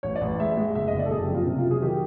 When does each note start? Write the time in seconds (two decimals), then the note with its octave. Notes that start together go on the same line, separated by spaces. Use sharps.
0.03 A1 C#5
0.16 D5
0.21 A1
0.40 G#3 E5
0.57 G#3
0.75 F#1 E5
0.87 D#5
0.94 F#1
0.99 D5
1.06 A4
1.11 F#1 G#4
1.23 G4
1.29 F2
1.35 F4
1.46 C3
1.59 F4
1.65 F#3
1.71 G#4
1.82 D#3 G4